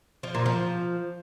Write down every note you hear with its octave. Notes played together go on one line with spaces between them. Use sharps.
F3
A#2
F3